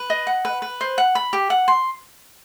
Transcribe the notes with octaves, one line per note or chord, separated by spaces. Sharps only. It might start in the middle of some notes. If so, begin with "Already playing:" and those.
Already playing: B4
D#5
F#5
B4
B4
C5
F#5
B5
G4
F#5
C6